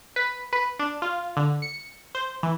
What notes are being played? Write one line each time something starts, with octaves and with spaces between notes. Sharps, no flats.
B4
B4
D4
F4
D3
C#7
C5
E3